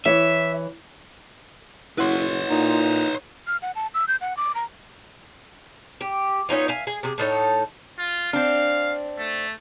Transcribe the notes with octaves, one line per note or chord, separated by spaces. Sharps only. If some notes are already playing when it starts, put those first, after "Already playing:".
E3 C#5 E5
F#1 E4 B4 C#5 F#5 C6
A#2 D#4
F6
F#5
A5
E6
G6
F#5
D6
A#5
G4
B3 C#4 D#4 F4
E5 F5 G#5
G#4
C3 G#4
A2 D#4 A4 C#5
F4
C4 D4 F5
A3